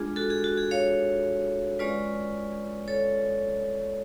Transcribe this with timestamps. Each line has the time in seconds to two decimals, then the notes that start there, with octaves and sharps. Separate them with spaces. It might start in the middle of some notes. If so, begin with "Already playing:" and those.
Already playing: G#3 D4 F4 G#4
0.16 F#4 A4
0.30 G#4
0.44 F#4
0.58 G#4
0.71 C#5 F5
1.79 G#3 C#4 F4 B4 D5
2.88 A4 C#5